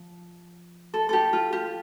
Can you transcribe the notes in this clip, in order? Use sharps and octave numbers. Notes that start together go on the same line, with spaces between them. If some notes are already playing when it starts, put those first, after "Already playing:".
Already playing: F3
A4
G4 A4
F4
G4